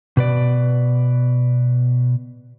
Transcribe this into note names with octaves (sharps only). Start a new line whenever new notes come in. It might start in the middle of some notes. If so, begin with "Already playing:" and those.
B2 B4 D5